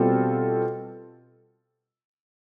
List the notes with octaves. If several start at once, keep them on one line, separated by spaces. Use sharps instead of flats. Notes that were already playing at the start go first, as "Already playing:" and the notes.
Already playing: B2 G3 C4 F4 A4